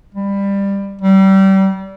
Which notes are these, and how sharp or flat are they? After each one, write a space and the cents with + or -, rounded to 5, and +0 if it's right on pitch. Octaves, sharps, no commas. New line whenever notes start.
G3 +20
G3 -30